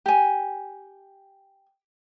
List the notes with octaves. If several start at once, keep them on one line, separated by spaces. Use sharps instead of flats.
G4 G#5